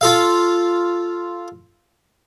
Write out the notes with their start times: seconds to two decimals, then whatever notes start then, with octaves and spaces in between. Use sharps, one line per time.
0.01 F4 A4 F5